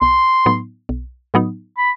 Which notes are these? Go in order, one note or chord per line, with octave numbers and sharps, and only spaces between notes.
B1 C6
A2 F#3 B3 D#4
B1
A2 F#3 B3 D#4
B5